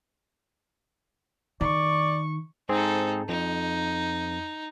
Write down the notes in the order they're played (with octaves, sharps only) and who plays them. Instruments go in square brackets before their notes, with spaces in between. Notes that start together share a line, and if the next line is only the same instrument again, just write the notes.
[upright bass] D#3 [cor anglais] D5 [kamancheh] C#6
[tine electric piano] G#2 C4 G#4 [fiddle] D#4 A4
[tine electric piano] F2 [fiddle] D#4